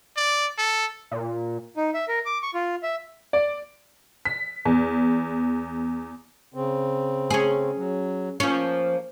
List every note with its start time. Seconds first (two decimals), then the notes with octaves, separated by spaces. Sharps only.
0.17 D5
0.58 A4
1.11 A#2
1.77 D#4
1.94 E5
2.08 A#4
2.26 D6
2.43 C#6
2.54 F4
2.83 E5
3.33 D5
4.25 B6
4.65 E2
6.54 C#3 C4
7.31 C#4 G#4
7.76 F#3
8.40 F3 A#3 C#4